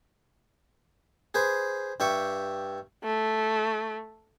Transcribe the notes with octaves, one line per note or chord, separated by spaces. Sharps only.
G#4 B4 C5
G2 G4 E5 C#6
A3